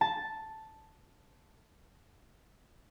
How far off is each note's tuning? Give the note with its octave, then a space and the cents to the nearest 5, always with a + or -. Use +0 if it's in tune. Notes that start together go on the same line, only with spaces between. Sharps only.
A5 +0